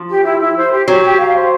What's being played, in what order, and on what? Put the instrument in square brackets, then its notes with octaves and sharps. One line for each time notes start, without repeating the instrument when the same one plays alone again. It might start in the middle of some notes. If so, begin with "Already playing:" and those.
Already playing: [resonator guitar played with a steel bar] F3
[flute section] G4
E4
E4
C5
G4
[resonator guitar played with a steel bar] F#3 [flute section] G4
[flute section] G4
F5
C5